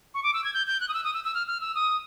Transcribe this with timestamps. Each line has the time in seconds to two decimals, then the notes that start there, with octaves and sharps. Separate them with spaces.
0.14 C#6
0.23 D6
0.34 E6
0.44 G#6
0.54 G6
0.67 G6
0.80 F#6
0.89 D#6
0.94 E6
1.04 D#6
1.14 E6
1.24 E6
1.35 F6
1.47 F6
1.61 E6
1.75 D#6